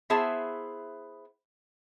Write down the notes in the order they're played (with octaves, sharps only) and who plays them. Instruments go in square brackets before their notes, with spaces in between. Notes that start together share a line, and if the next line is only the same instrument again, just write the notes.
[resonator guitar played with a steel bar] B3 E4 G#4 C5 E5 A5